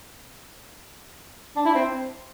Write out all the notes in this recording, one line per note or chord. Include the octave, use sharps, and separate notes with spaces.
D4
E4
C4